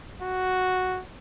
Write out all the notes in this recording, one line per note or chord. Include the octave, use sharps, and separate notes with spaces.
F#4